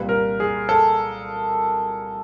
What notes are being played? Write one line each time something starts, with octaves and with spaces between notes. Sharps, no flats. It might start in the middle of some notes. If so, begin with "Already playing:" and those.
Already playing: C2 A#2 G3 B4
A#4
G#4
A4